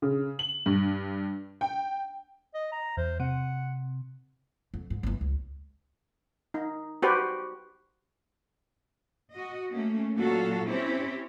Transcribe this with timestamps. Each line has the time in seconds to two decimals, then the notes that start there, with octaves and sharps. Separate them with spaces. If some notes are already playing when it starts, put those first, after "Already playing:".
0.02 C#3
0.39 F#7
0.66 G2
1.61 G5
2.54 D#5
2.72 A#5
2.97 E2 C5
3.20 C3 F#5
4.74 F2
4.90 G#2
5.03 G1 E3
5.21 C#2
6.54 D#4
7.02 F#4 G4 B4 C5
9.33 F#4 D#5
9.73 A3 A#3 C#4
10.17 A#2 F#3 F#4 A4 F5
10.68 C4 C#4 E4 G4 C#5